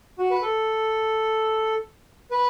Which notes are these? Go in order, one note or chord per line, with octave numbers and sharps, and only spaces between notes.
F#4
B4
A4
B4